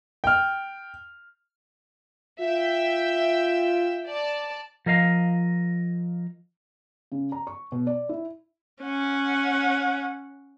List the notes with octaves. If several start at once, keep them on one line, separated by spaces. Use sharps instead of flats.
G5 F6
F4 E5 G5 E6
D5 A5
F3 A#4 D#5 F5
C#3
A#5
C#6
B2
D5
E4
C#4 F#5